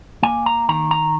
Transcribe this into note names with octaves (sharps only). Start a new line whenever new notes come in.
A#3 G#5
A#5
D#3 A#5
A#5